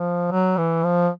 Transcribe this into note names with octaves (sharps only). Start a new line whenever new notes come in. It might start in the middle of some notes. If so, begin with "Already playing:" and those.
Already playing: F3
F#3
E3
F3